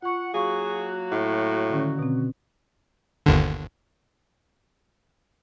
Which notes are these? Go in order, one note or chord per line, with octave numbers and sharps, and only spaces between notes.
F4 F#5 C#6
F#3 A#3 F#4 G#4 F5 C#6
A2
D3 D#3 C#4
B2 C4
G1 D#2 D3